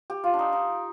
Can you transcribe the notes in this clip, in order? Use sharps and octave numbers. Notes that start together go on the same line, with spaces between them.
G4
F4
D4
D#4
D#4